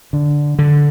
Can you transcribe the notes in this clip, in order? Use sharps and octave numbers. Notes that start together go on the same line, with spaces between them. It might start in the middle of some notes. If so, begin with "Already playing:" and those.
D3
D3